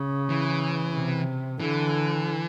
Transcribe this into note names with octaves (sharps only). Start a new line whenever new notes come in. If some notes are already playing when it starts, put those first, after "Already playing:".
Already playing: C#3
E3
C3
D3 E3